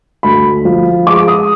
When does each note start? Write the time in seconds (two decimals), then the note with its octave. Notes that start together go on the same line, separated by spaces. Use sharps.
0.23 D2 B5
0.65 F3
1.07 G#3 D6
1.28 D#6